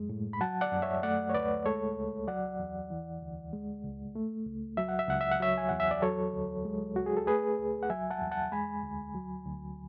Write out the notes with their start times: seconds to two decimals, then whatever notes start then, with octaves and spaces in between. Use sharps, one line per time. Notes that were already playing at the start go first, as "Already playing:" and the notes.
Already playing: F#2 G#3
0.09 A2
0.33 B5
0.41 F#3 F#5 A5
0.61 D5 F#5
0.72 F#2
0.82 C#5 E5
1.03 A3 D5 F#5
1.30 C#5
1.34 D2 B4 D5
1.66 G#3 A4 C#5
1.97 C#2
2.27 F#3 D5 F#5
2.60 E2
2.90 E3
3.21 D2
3.53 G#3
3.84 C#2
4.15 A3
4.46 C#2
4.77 F#3 E5
4.89 F#5
4.99 E5
5.09 C#2 F#5
5.21 E5
5.31 F#5
5.40 F#3 C#5 E5
5.58 G#5
5.69 E2 F#5
5.80 E5
5.91 D5
6.02 F#3 A4 C#5
6.33 D2
6.65 G#3
6.96 C#2 F#4
7.06 G#4
7.17 A4
7.27 A3 G#4 B4
7.58 C#2
7.83 F#5
7.90 F#3 E5 G#5
8.11 F#5 A5
8.21 E2
8.31 F#5 A5
8.52 G#3 G#5 B5
8.83 D2
9.15 F#3
9.45 D2